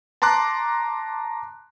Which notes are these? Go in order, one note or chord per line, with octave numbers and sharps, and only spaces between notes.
A5 A#5 C6 D6 F#6